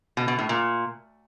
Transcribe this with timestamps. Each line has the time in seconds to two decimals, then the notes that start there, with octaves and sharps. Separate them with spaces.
0.17 B2
0.28 B2
0.39 A2
0.49 A#2